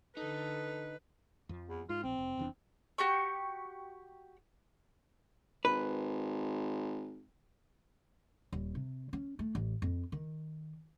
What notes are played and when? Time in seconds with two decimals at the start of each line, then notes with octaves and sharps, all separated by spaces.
0.17 D3 D#4 A4 B4
1.49 F2 F3
1.68 E2
1.89 G#2 F4
2.04 A#1 C4
2.18 F1
2.37 F1 E2 D4
2.98 F#4 G4 C#6
5.65 G#1 B4
8.52 D#1
8.75 C3
9.13 C#4
9.39 A3
9.55 A1
9.82 F2
10.12 D#3